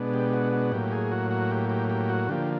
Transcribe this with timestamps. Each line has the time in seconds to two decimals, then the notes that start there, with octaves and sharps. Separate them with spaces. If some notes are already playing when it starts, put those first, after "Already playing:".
Already playing: B2 G#3 B3 D4
0.13 G4
0.33 F#4
0.53 F#4
0.72 A2 F#3 A#3 G4
0.92 G#4
1.12 F#4
1.31 F#4
1.51 G4
1.69 G4
1.90 G4
2.09 F#4
2.29 D3 F3 A#3 G4